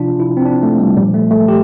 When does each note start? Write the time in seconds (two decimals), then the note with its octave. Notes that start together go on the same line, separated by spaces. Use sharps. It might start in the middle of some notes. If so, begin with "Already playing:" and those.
Already playing: C3 F3 D4 F4
0.20 E4
0.37 C4
0.45 D4
0.63 A3
0.80 G3
0.97 A#2 F3 G3
1.14 A3
1.31 A3
1.48 G4